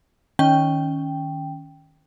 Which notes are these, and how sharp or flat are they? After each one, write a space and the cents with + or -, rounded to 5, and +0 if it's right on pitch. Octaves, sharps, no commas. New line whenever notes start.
D#3 +0 C#4 +0 G5 +0